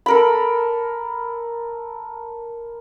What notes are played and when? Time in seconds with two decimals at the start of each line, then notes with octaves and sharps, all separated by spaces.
0.06 A4 A#4 B5